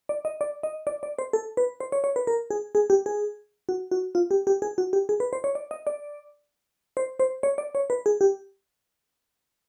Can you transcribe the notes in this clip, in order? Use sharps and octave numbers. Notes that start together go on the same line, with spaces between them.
D5
D#5
D5
D#5
D5
D5
C5
A4
B4
C5
C#5
C#5
B4
A#4
G#4
G#4
G4
G#4
F#4
F#4
F4
G4
G4
G#4
F#4
G4
G#4
B4
C5
C#5
D5
D#5
D5
C5
C5
C#5
D5
C#5
B4
G#4
G4